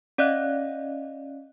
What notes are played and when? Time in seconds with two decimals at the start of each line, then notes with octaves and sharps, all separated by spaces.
0.18 C#4 D5 D#5 F5 F#6